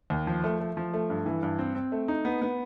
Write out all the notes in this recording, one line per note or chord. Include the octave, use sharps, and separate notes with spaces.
D#2
F3
A3
A3
F3
A3
G2
E3
G2
C4
C4
A3
D#4
B3
B3